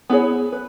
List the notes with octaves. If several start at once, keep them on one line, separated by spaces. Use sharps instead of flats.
B3 E4 G#4 C#5
B4